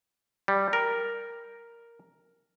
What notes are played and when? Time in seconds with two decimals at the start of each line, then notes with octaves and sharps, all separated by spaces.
0.48 G3
0.73 A#4